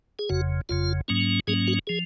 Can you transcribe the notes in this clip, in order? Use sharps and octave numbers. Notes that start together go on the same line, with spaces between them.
G#4
F#1 F2 C#3 F#4
F#1 F2 C#3 F4
G#2 F#3 A#3 C#4
G#2 F#3 A#3 C#4 G#4
F#4
F3 G#4